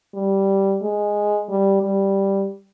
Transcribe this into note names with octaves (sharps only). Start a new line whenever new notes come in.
G3
G#3
G3
G3